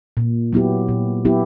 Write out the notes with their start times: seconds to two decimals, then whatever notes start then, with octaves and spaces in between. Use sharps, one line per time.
0.17 A#2
0.53 F#3 B3 E4 G4
0.88 A#2
1.25 F#3 B3 E4 G4